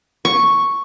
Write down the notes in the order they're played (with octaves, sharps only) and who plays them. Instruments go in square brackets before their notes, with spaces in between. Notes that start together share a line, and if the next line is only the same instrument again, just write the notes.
[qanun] C#6